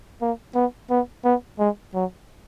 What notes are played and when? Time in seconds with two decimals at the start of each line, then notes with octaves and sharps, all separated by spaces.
0.21 A#3
0.55 B3
0.90 B3
1.25 B3
1.59 G#3
1.94 F#3